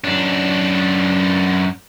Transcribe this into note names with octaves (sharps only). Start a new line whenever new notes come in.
F#2 D4